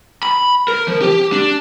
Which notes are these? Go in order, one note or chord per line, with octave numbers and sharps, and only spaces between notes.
B5
A#4
F3
G4
D4